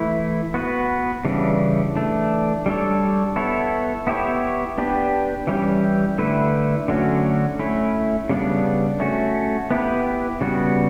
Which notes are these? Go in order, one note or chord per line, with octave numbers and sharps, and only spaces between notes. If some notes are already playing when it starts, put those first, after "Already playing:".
Already playing: E3 A3 E4
B3 F#4 B4
C#3 E3 G3 D4
E3 A3 D4
G3 D4 A4 C#5
B3 E4 A4 C#5
B3 E4 G4 C#5
B3 D4 G4 B4
E3 G3 C#4 G4
D3 A3 E4 B4
D3 F#3 A3 C#4 F#4
A3 C#4 E4
C#3 G3 B3 D4
A3 C#4 F#4
B3 E4 G4 B4
C#3 G3 B3 F#4